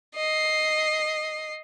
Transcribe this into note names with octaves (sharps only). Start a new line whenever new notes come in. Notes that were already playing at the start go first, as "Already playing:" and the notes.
D#5 C7